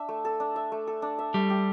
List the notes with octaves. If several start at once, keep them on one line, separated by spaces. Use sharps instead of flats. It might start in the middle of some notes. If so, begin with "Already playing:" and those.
Already playing: D4 E5
A3
A4
D4
E5
A3
A4
D4
E5
G3 A3
G4